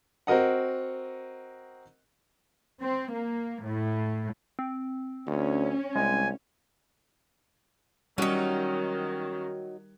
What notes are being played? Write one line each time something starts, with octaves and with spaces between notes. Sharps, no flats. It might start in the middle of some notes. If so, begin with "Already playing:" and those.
C4 F#4 A#4 D#5 F#5
C4
A#3
A2
C4
D2 C#4
C2 G#3 G#5
D#3 F#3 G3 C#4 D#4 F#4